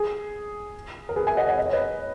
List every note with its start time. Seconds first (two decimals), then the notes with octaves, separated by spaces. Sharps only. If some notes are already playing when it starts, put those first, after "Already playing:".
Already playing: G#4
1.09 A#4
1.16 G#4 B4
1.27 E5 G#5
1.37 D#5 F#5
1.47 D#5 F#5
1.58 D#5
1.66 C#5
1.73 B4 D#5